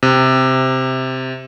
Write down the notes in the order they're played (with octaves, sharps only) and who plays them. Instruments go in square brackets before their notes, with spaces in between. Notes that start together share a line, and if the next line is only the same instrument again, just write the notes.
[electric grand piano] C3